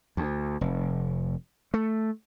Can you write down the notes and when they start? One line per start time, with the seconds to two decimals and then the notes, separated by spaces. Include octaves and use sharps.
0.17 D2
0.61 F1
1.74 A3